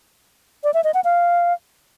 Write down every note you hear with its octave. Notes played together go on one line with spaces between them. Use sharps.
D5
E5
D#5
F#5
F5